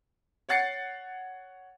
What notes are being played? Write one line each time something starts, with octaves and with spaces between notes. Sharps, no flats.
C#5 F#5 A6 C7 C#7